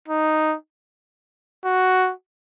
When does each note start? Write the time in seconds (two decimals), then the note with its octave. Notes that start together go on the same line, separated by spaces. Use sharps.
0.08 D#4
1.65 F#4